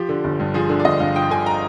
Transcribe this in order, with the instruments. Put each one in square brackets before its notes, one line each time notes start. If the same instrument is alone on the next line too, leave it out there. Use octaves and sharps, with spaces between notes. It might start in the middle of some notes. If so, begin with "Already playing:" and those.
Already playing: [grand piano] F3 G4
D3
G1
G2
F3 G#4
D3
D5
G1 D#5
G2 F5
F3 G5
D3 G#5
A#5